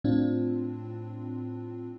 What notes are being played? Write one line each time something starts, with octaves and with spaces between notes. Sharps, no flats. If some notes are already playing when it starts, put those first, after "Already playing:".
A2 C4 D4 F4